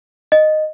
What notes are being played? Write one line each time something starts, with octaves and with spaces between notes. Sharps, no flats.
D#5